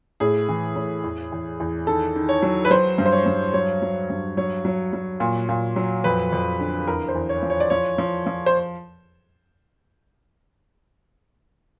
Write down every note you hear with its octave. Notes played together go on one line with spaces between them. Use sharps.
A2 G#4
E3
A2
E2
E2
E2
D#3 A4
D#3
C#5
F#3
B4
F#3 C5
G2
C5
C#5
G2
F#3 C#5
F#3
G2
F#3 C#5
F#3
F#3
A#2
A#2
F#3
F2 B4
F2
D3
E2 A#4
C5
E2
C#5
F3
C#5
D5
F3 C#5
F3
F3
C5